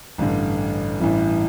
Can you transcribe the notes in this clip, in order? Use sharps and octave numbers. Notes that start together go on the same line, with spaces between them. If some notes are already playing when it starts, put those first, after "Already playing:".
A1 G2 D3
A1 G2 E3